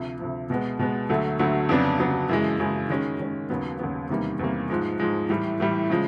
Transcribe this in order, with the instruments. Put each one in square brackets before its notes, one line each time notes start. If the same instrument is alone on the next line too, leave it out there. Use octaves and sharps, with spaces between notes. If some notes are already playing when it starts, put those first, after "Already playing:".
Already playing: [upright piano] D2 C3 F3
D2 C3 F3
B2 G#3 B3
B2 G#3 B3
D2 D3 F#3 A3
D2 D3 F#3 A3
F2 C#3 F#3 B3 D4
F2 C#3 F#3 B3 D4
F#2 C#3 E3 G#3
F#2 C#3 E3 G#3
D#3 G#3 C#4
D#3 G#3 C#4
D#2 C#3 F#3 B3
D#2 C#3 F#3 B3
E2 C3 D#3 G3 A#3
E2 C3 D#3 G3 A#3
G#2 F3 G#3
G#2 F3 G#3
A2 E3 G3
A2 E3 G3
C#3 F3 G#3